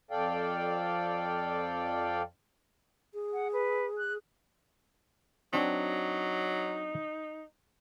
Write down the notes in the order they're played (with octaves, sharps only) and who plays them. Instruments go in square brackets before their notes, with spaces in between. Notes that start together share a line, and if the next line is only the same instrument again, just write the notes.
[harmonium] F2 A4 D5 F5 G5
[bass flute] G#4
[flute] F#5
B4
F#6
[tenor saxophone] F#3 [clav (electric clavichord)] C4 D4 F#4 [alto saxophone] D#4